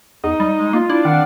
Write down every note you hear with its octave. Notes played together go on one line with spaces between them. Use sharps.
E2 D#4
G3
G#3
A#3 F4
D4 E4
D#3 C4 F5 F#5